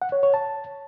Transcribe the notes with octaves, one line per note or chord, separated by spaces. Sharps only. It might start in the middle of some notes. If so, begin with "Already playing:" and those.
F#5
C#5
C#5
A5